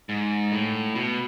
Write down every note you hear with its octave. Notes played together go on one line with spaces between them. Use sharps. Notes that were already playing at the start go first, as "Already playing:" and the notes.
G#2
A2
B2